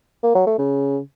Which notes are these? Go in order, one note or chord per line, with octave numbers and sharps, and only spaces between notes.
A#3
F#3
A3
C#3